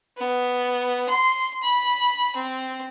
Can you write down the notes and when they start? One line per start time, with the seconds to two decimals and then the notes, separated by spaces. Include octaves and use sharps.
0.18 B3
1.09 C6
1.63 B5
2.36 C4